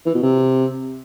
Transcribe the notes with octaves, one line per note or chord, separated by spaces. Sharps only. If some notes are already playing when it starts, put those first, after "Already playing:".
E3
B2
C3